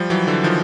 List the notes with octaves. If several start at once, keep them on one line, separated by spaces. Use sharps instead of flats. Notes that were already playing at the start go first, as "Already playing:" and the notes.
Already playing: F3 G3
E3 F#3
D3 E3
D#3 F3